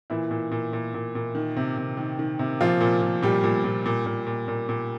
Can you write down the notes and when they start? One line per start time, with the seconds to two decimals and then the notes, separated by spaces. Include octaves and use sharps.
0.10 A#2 E3 E4
0.31 A#2
0.51 A#2
0.73 A#2
0.94 A#2
1.15 A#2
1.35 D#3
1.56 C3
1.77 C3
1.97 D#3
2.19 D#3
2.39 C3
2.61 A#2 F3 F4
2.81 A#2
3.02 A#2
3.22 A#2 G3 G4
3.44 A#2
3.64 A#2
3.86 A#2
4.06 A#2
4.27 A#2
4.48 A#2
4.69 A#2